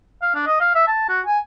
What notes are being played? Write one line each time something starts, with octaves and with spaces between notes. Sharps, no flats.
F5
D4
D#5
F5
E5
A5
F#4
G#5